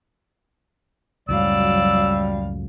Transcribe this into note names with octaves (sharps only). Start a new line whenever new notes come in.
C#2 F#2 A2 F#3 G3 D5 F5 E6